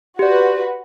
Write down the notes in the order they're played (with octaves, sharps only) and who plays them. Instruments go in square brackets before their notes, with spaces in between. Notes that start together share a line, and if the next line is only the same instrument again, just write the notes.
[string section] F#4 B4 [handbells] G4 D5